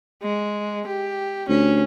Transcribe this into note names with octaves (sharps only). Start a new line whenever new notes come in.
G#3
G4
D2 C#4